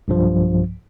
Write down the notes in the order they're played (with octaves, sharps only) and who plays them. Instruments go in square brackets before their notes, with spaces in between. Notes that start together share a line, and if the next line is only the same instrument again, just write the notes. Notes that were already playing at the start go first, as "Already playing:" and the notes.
[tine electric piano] B1 G2 F3